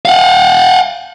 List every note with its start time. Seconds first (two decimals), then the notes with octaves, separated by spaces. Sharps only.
0.05 F5 F#5